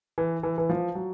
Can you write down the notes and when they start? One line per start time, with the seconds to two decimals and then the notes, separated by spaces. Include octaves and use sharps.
0.18 E3
0.43 E3
0.58 E3
0.69 F3
0.95 F#3